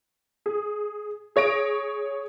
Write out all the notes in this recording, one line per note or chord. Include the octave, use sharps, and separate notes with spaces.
G#4
G#4 C#5 A#6 D7